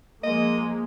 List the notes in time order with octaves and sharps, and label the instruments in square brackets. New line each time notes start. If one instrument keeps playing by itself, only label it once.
[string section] F3 G#3 A#3 [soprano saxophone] D#5